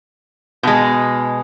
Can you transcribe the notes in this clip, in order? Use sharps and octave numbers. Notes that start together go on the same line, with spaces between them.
B2 G#3